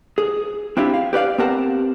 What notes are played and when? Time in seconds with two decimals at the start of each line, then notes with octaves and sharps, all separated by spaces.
0.18 G#4
0.77 C4 D4 E4 F4 G4
0.94 F5
1.13 G4 B4 D5 F5
1.38 B3 C4 G4 A#4 F#5 A5